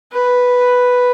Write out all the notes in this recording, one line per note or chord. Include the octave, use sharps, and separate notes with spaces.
B4